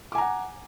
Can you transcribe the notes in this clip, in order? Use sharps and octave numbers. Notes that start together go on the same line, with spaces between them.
F#5 G#5 A#5 D6